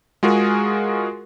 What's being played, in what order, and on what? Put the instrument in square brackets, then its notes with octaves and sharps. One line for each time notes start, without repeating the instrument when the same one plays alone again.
[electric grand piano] G#3 F4 F#4 G#4 A#4